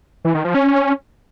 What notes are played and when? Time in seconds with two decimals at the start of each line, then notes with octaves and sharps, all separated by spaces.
0.25 E3
0.35 D#3
0.45 F3
0.55 C#4